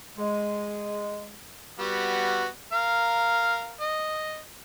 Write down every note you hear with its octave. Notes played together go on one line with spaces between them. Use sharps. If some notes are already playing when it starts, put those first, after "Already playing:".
G#3
G3 B3 F#4
A#4 F5
D#5